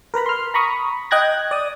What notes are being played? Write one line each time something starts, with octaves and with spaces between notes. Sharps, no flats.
A#4 B4 A#5 B5
C6 F6
A#5 B5 C#6 D#6
D#5 G5 F#6 G#6 A#6
D5 D#6